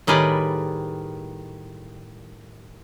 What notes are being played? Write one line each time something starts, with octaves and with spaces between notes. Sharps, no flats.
A2 D#3 G3 G#4 B4 D5